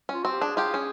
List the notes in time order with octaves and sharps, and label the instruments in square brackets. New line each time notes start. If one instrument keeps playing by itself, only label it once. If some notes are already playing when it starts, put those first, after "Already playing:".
[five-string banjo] C#4
[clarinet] F4
[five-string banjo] C4 [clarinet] F#4
[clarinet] G4
[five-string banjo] D4 [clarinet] G#4
[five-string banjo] F4 G4
C#4